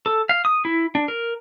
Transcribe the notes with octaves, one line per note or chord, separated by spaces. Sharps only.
A4
F5
D#6
E4
D4
A#4